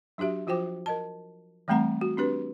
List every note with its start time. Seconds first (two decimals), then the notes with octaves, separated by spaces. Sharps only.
0.18 F#3 D4 F#4 G4 E5
0.47 F3 F4 F#4 C5 G5 D6
0.86 A#4 D#5 A5
1.68 E3 G3 A3 C4 F#5 A#5
2.01 F#4
2.17 C4 D4 G4 B4